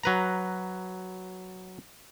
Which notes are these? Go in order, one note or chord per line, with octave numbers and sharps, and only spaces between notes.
F#3 B4 A#5